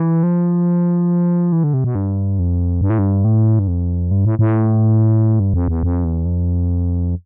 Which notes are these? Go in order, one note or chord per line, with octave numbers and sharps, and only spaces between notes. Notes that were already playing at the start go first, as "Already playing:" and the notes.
Already playing: E3
F3
E3
D3
C3
B2
G2
F2
G2
A2
G2
A2
G2
F2
G2
A2
A2
G2
F2
E2
F2
E2
F2